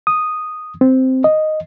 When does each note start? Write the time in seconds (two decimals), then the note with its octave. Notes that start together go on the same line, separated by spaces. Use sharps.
0.07 D#6
0.81 C4
1.24 D#5